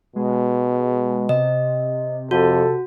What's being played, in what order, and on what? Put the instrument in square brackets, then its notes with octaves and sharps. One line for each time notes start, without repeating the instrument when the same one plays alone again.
[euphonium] B2 [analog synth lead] G#3
[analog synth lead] C3 [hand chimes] D#5
[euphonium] F2 [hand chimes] F#4 [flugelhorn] A4